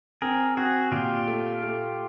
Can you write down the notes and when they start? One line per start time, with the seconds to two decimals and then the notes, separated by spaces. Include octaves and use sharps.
0.22 C4 G#4 A#4
0.57 C4 F#4 G#4
0.91 A#2 F4 G4
1.27 A3
1.62 A3